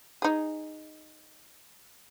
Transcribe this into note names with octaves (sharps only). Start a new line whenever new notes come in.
D#4 G#4